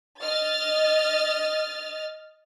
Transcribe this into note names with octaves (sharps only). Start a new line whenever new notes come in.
D#5 F6 A6